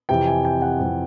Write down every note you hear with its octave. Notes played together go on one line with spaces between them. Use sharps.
F2 C3 E3 G5
G#5
G5
F#5
F2 C3 E3